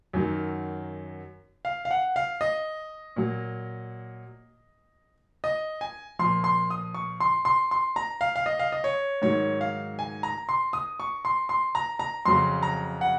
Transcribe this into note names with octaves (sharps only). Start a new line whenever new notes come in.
F#2 D#3 F#3
F5
F5
F#5
F5
D#5
A#2 F#3
D#5
G#5
A#2 F3 C6
C6
D#6
C#6
C6
C6
C6
A#5
F5
F5
D#5
F5
D#5
C#5
G#2 D#3 F#3 C#5
F5
G#5
A#5
C6
D#6
C#6
C6
C6
A#5
A#5
F2 C#3 F#3 C6
A#5
F#5